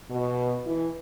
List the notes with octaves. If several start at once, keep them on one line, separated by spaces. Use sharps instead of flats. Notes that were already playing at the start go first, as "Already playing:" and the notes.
B2
E3